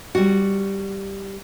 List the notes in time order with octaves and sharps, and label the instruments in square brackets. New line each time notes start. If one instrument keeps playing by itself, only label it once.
[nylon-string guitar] G3 F#4